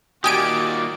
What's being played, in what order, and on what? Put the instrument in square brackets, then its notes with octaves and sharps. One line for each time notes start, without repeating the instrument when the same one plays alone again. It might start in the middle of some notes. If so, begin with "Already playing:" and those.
[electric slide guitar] A#2 D#3 [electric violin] F#4 D5 [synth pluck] G4 G#5 D7 [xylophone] D#6